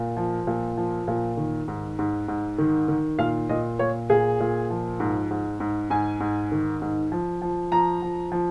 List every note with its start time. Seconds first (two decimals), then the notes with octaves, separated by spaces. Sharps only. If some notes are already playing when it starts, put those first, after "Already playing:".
Already playing: A#2
0.17 F3
0.47 A#2
0.77 F3
1.08 A#2
1.37 D#3
1.68 G#2
1.99 G#2
2.28 G#2
2.58 D#3
2.88 D#3
3.19 A#2 F5
3.49 A#2 D#5
3.79 A#2 C#5
4.10 A#2 G#4
4.40 A#2
4.70 F3
5.00 G#2
5.31 G#2
5.60 G#2
5.90 G#2 G#5
6.20 G#2
6.52 D#3
6.82 G#2
7.12 F3
7.42 F3
7.72 F3 A#5
8.02 F3
8.32 F3